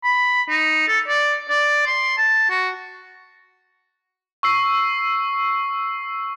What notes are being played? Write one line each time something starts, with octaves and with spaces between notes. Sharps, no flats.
B5
D#4
A4
D5
D5
C6
A5
F#4
C#6 E6 C7